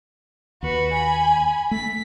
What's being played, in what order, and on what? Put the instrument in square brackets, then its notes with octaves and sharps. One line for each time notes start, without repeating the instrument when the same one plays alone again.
[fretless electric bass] D#2 [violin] F#4 B4
[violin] G#5 B5
[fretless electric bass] A3 [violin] B6